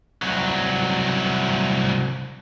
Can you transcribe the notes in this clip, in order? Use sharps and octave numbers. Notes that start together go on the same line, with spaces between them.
C2 F#3